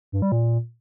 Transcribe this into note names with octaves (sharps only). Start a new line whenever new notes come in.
G2
G3
A#2